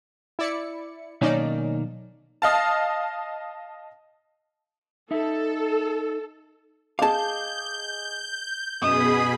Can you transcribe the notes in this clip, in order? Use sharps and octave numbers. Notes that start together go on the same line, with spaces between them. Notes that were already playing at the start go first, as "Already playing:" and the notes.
E4 D5 C#7
B1 D#3 A#3 C#4 D#4 D5
D#5 F5 A5
D#4 A4 E5
G#4 D#5 F5 A5 D6 G6
F#2 B2 G#4 D#5 B5 D#6 E7